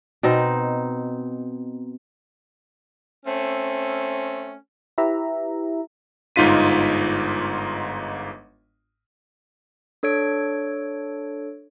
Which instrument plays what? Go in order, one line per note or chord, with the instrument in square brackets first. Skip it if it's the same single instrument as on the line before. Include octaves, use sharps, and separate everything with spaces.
[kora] B2 C4 D#4
[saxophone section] A3 C4 C#4
[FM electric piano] E4 G4 B4 E5 A#5
[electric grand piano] G1 G#2 D#4 F4 B6 D#7
[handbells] D4 A4 C#5 G#6 D7